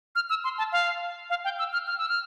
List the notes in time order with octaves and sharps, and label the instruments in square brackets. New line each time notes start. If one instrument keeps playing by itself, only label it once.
[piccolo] F6
E6
C6
A5
F5
F5
G5
E6
F6
F6
E6
F6